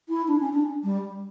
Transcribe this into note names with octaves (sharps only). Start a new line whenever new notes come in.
E4
D4
C#4
D4
G3